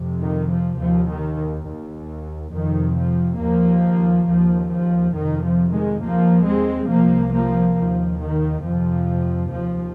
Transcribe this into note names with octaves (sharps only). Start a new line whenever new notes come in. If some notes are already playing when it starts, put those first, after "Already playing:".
Already playing: F2 C3
D#3
F3
D#2 F3
D#3
D#2
F2 C3 D#3
F3
D#2 F3 A#3
D#2 F3
F3
F2 C3 D#3
F3
D#3 G#3
D#2 F3 A#3
G#3 C4
C2 C3 F3 A#3
F3 A#3
D#2 F3
D#3
F2 C3 F3
D#2 F3